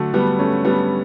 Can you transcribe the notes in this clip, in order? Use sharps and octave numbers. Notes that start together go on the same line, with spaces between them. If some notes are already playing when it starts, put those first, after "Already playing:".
Already playing: D3 F#3 A3
G3 B3
A3 C#4
G3 B3